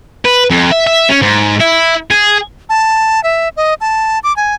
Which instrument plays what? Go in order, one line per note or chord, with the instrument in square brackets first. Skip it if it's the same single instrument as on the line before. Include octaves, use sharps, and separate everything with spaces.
[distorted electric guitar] B4
F2
E5
E5
C#4
G#2
E4
G#4
[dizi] A5
E5
D#5
A5
D6
G#5